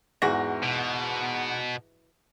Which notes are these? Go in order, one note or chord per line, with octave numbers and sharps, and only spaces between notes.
E2 G#2 E3 F#4 A#6
B2